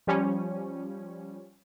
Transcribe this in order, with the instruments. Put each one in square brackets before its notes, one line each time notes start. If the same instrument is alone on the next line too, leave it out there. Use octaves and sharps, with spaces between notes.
[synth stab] F3 G3 C#4